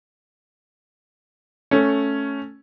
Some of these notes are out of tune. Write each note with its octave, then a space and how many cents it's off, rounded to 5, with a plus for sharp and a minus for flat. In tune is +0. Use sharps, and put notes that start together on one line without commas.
A3 +0 C#4 +0